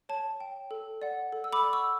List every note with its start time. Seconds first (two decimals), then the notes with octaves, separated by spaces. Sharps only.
0.09 C#5 A5
0.40 G5
0.71 A4
1.02 D5 F#5
1.32 A4
1.44 E6
1.53 B5 D6
1.63 D5 F#5
1.73 C#6 E6